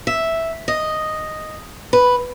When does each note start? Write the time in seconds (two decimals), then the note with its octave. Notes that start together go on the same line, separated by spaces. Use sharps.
0.07 E5
0.68 D#5
1.93 B4